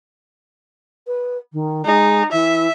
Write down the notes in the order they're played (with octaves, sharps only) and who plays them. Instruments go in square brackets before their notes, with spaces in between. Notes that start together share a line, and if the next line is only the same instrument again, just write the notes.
[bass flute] B4
D#3
[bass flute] G#3 [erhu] D#4
[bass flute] E3 [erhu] E5